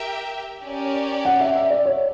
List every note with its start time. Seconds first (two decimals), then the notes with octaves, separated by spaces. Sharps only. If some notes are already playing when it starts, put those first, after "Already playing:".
Already playing: G4 A#4 E5 G5
0.64 C#4 G4 A#4 D5
1.25 F#5
1.41 E5
1.55 E5
1.70 D5
1.86 C#5